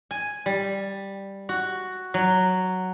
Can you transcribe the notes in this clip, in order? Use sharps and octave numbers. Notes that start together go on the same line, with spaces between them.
G#5
G3
F#4
F#3